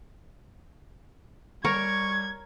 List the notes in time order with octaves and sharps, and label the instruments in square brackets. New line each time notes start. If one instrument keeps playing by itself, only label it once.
[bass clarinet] G3 [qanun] A#4 C#5 [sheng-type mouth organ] C#6 [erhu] G#6